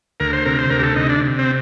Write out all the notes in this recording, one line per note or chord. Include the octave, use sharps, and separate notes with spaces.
D2 A#4
C5
C3 A#4
C5
D2 A#4
G4
A4
C3 D#4
D4
C3
C4